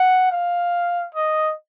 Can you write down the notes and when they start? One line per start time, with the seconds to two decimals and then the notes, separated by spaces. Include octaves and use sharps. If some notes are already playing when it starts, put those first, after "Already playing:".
Already playing: F#5
0.32 F5
1.15 D#5